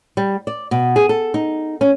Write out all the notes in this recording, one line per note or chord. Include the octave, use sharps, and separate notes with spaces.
G3
D5
B2
G#4
A4
D#4
C#4